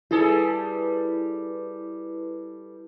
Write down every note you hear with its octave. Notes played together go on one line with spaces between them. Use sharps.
G3 E4 G#4 A4 B4